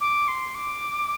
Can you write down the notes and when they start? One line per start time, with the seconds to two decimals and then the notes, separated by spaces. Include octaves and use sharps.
0.01 D6
0.28 C6
0.55 D6